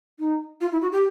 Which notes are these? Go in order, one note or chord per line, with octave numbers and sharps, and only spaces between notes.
D#4
F4
E4
F#4
G4